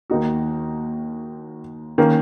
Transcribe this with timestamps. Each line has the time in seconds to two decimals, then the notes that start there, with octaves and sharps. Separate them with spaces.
0.10 D#2 D#3 A#3 D#4 F#4
1.98 D#3 A#3 C#4